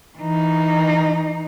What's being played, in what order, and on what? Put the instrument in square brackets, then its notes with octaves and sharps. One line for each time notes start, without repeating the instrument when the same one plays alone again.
[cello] E3 D#4